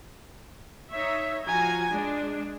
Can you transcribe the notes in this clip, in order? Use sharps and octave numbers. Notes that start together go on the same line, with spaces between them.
D#4 C#5 E5
F3 F#4 G#5 A#5
G#3 D4